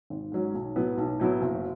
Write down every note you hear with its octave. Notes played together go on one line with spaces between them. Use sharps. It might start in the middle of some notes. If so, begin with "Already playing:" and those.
G#1
G#2 F#3 C#4
B1
A2 F#3 B3 E4
B1
A2 F#3 B3 E4
F#1